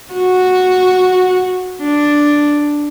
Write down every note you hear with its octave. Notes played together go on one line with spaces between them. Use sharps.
F#4
D4